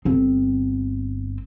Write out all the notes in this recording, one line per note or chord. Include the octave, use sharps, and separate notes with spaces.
G1 C4